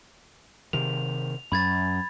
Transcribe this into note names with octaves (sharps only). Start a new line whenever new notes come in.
C3 D#3 F7
F#2 B5 G#6 A6